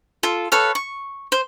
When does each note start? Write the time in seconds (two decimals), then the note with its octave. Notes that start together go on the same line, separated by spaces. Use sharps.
0.23 F4 A4
0.52 A4 B4 C#5 F5
0.75 C#6
1.32 C5